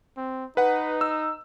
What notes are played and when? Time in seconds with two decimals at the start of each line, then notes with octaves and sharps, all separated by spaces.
0.17 C4
0.57 D#4 B4 F#5
1.01 E6